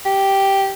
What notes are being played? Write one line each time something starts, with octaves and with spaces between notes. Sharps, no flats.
G4